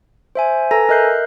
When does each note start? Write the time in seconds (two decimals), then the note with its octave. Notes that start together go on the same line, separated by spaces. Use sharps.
0.35 C5 E5 G#5
0.71 A4 B4 G#5 A#5 A#6
0.89 A#4 D#5 E5 F#6 G6 C7